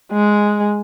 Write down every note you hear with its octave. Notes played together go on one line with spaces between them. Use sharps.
G#3